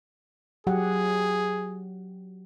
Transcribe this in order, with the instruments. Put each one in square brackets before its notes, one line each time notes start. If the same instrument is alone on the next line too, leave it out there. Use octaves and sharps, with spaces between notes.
[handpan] F#3 G4 F#5 [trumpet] G#4